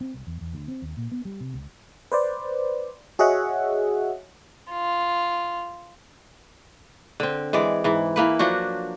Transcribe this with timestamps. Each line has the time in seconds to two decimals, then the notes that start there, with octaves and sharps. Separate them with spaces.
0.01 C4
0.14 C2
0.27 E2
0.41 E2
0.54 D2
0.68 C4
0.82 D#2
0.97 A#2
1.12 B3
1.25 G3
1.40 C3
1.54 C#2
2.12 B4 C5 D5
3.19 F#4 G#4 C#5 D#5 E5 F#5
4.72 F4
7.20 D3 C4
7.53 E3 G#3 D5
7.84 G#2 E3
8.16 E3 A#3 B4
8.39 F3 F#3 D4 F#4